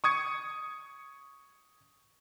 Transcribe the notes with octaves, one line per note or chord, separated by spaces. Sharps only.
C#6 D#6 G#6 C#7